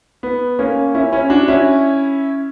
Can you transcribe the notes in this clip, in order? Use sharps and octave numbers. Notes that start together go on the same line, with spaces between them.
B3
A#3 C#4
C#4 E4
C#4 E4
D4 F#4
C#4 E4